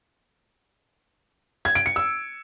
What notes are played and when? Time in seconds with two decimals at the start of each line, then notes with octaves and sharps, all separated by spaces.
1.65 G#6
1.75 D7
1.86 C#7
1.96 E6